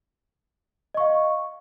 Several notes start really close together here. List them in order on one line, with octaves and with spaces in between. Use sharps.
D#5 C#6 F5